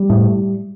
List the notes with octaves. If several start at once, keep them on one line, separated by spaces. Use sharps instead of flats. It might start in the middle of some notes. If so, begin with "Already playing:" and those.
Already playing: G3
A2